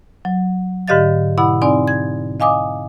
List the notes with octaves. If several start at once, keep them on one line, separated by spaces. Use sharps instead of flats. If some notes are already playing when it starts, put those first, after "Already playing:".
F#3
G#2 D3 G4 D#5 F5 A6
B2 E4 F#5 B5
C4 D#4 D5 G#5
G#6
D#5 F5 G#5 D6 D#6